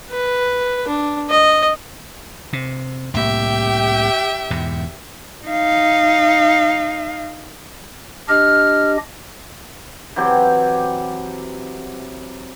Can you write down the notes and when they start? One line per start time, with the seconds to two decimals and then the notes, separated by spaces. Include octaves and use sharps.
0.11 B4
0.87 D4
1.30 D#5
2.53 C3
3.14 C2 A2 A#3 G4 E5 G5
4.50 E2 G#2 B2
5.46 D#4 F5
8.29 D4 G4 D#5 F6
10.16 E3 F#3 C4 G4